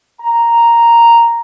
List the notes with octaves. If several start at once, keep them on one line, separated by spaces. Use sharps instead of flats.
A#5